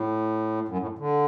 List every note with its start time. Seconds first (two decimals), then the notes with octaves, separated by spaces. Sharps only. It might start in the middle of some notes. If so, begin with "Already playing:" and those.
Already playing: A2
0.68 F#2
0.78 A2
0.98 D3